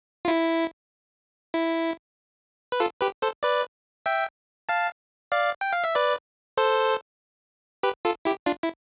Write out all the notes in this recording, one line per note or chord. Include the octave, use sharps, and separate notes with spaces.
F4
E4
E4
B4
F4 A4
G4 B4
A4 C5
B4 D5
E5 G5
F5 A5
D5 F5
G5
F5
E5
B4 D5
A4 C5
G4 B4
F4 A4
E4 G4
D4 F4
E4